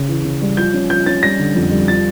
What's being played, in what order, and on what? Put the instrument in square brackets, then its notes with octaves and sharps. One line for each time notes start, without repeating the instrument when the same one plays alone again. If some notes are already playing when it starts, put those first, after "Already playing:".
Already playing: [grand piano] C#3
E3
C#3
G3
F3 G6
C#4
F3 G6
C#4 A6
G3 A#6
D3
F2
G3
F3 A6